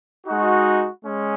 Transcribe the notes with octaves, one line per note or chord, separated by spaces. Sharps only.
G#3 D#4 F#4
G#3 C#4